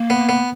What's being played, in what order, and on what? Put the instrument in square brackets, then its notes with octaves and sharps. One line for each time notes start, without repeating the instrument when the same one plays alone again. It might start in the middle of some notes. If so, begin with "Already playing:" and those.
Already playing: [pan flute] A#3
[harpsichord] B3
B3